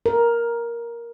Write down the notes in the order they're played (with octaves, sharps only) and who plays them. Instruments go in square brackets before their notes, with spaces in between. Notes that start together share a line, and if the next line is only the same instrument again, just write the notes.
[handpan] A#4